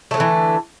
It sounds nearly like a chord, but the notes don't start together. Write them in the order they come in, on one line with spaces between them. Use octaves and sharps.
A3 F#3 D3 E3